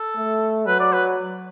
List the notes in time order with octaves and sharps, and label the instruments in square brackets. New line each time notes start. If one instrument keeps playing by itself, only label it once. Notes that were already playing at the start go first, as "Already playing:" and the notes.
Already playing: [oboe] A4
[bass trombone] A3
[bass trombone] F#3 [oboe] B4
[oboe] D5
B4